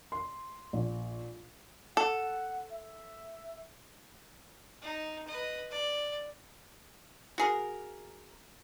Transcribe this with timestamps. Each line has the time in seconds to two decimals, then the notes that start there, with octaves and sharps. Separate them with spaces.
0.12 C6
0.73 A#1
1.97 A4 F#5
2.72 E5
4.82 D#4
5.28 B4 D#5
5.70 D5
7.38 F#4 G#4 A#4